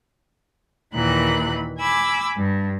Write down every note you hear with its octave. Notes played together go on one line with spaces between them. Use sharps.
D#2 A#2 D#3 E3 B5 F#6
G#5 B5 D6 E6
G2